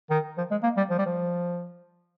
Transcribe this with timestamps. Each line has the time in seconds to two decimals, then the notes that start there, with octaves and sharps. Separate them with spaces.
0.10 D#3
0.38 F3
0.51 G#3
0.63 A#3
0.77 G3
0.91 F3
0.99 G3
1.07 F3